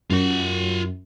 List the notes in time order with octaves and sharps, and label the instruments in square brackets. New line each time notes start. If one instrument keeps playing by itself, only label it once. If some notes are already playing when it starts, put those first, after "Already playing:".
[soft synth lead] F#2 [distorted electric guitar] F4 F#5